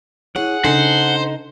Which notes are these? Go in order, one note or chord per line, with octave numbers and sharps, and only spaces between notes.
E4 G#4 C#5 F#5
C#3 D4 D#4 A4 C5 G#5